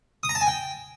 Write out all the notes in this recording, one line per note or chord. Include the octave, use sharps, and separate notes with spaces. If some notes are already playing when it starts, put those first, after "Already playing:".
D#6
A#5
A5
G#5
G5